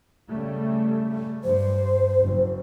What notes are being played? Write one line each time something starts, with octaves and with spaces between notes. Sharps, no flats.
C#3 G3 A3
G2 C5
F#1